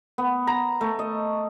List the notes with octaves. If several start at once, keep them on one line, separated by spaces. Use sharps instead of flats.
B3
A#5
A3
D#5